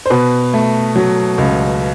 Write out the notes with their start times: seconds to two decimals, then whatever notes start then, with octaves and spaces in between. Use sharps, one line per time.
0.06 C5
0.10 B2 B4
0.54 A3
0.96 F#3
1.38 C#2